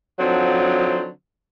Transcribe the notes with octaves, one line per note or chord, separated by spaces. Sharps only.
D3 F3 F#3 C4 D#4 C5